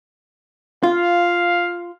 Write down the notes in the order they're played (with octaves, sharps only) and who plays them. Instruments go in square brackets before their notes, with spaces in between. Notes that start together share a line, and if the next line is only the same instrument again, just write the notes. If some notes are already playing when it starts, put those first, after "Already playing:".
[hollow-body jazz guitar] F4 [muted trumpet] F5